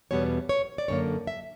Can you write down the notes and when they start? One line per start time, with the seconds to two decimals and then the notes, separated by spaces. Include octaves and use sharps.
0.11 E2 B2 G3 B3 C#5
0.49 C#5
0.78 D5
0.88 F#2 D3 A#3 C#5
1.27 E5